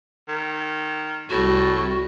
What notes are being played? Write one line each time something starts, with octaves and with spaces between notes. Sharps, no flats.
D#3
C2 A2 G3 F#4